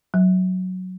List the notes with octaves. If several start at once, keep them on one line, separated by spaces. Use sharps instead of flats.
F#3